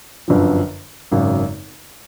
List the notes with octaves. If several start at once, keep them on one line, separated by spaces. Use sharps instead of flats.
G1 F#2 D3 F3
G#1 F#2 C#3